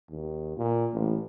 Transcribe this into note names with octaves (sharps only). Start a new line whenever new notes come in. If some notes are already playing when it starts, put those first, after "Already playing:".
D#2
A#2
A1